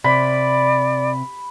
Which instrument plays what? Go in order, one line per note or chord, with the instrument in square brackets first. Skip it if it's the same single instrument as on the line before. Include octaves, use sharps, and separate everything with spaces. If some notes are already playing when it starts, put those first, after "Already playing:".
[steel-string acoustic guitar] C3 [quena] D5 [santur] B5